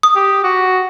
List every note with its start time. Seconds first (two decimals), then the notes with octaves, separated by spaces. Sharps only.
0.03 D#6
0.15 G4
0.44 F#4